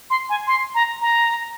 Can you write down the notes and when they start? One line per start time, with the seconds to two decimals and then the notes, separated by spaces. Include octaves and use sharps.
0.10 C6
0.29 G#5
0.47 C6
0.75 A#5
1.01 A#5